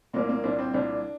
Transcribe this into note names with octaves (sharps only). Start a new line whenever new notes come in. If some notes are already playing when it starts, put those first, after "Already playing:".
C2 A#2 A#3
A#3
C2 A#2 D4
C4
C2 A#2 D4